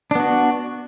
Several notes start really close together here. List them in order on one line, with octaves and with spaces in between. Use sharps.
D4 B3 F#4